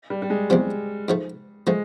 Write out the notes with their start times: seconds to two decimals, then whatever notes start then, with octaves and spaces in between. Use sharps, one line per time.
0.10 G3
0.22 G3
0.30 G#3
0.50 E2 C3 F3
1.08 G#2 F3 A3
1.67 F3 G#3 A3